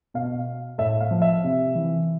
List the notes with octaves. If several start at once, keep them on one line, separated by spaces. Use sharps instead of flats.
B2 F5
A2 E5
F5
F3
E5
C3
E3